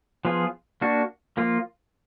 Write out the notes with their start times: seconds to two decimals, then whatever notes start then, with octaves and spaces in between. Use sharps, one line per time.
0.25 F3 B3 F4 G#4
0.81 A#3 D4 F#4
1.37 F3 A#3 F4